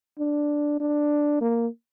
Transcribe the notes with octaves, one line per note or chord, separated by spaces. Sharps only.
D4
D4
A#3